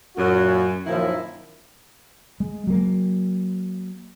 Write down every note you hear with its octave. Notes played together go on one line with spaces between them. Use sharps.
F#2 A#2 F#4
F#2 A#2 D#3 F3 E4
G#3
F#3 A#3